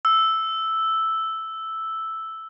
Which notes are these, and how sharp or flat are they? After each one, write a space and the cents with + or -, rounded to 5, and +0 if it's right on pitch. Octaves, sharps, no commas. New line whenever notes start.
E6 +0